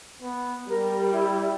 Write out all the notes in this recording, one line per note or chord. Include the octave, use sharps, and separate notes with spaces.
B3
G3 A#4
E4